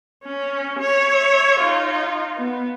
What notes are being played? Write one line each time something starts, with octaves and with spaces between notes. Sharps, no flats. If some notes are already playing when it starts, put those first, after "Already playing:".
C#4
C#5 E5
D#4 F4
B3